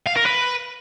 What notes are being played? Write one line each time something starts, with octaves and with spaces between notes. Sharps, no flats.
F5
A#4
B4